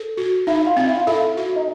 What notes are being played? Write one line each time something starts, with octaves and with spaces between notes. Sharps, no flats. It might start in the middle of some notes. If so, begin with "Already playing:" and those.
Already playing: A4
F#4
D#4 E4
F4
C4
E4
F4
E4 A4
F#4
D#4